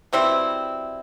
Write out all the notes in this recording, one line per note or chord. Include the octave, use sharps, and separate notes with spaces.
B2 G3 C4 E4